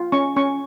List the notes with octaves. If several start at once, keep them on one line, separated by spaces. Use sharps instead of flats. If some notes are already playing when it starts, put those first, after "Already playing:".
Already playing: F4
C#4 C#6
C#4 C#6